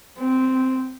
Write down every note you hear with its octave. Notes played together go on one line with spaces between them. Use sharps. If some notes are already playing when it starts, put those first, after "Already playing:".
C4